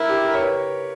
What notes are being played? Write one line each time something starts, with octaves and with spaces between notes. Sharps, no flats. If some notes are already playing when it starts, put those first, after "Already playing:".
Already playing: E4 A#4
G4
A#4
C#5
B4